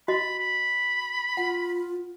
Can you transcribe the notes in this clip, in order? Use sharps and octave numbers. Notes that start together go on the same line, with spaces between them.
F#4 D#5 B5
B5
F4 F#5